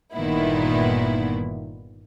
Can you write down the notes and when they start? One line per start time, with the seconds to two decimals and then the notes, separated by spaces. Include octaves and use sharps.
0.13 G1 A#2 D#3 B3 E4